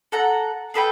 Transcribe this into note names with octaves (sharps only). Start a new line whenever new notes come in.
A4 F#5 A#5
G#4 A4 B4 G5